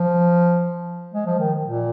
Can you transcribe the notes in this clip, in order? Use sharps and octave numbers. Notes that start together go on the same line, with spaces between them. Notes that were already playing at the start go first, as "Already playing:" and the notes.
Already playing: F3
G#3
F3
D#3
A#2